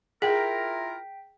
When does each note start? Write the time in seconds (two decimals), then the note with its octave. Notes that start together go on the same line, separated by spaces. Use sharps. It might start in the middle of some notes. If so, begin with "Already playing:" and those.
0.22 E4 F4 G#4 A#4 G5 B6